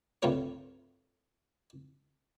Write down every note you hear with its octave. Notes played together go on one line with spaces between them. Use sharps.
C2 G2 A3 F4 A#4 C#5